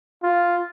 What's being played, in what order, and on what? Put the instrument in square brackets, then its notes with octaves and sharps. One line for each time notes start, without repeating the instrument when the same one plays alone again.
[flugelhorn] F4